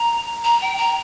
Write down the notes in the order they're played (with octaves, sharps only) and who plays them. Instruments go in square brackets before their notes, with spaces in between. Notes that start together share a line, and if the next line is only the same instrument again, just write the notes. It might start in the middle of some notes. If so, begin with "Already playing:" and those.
Already playing: [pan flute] A#5
A#5
G5
A#5